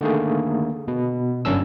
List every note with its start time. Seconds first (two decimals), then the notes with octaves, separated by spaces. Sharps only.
0.01 D3 D#3 A3 A#3 G#4
0.88 B2
1.45 G1 F#2 C#4 D4 E6